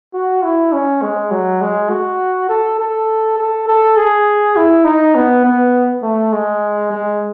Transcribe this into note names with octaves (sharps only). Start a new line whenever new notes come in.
F#4
E4
C#4
G#3
F#3
G#3
F#4
A4
A4
A4
A4
G#4
E4
D#4
B3
B3
A3
G#3
G#3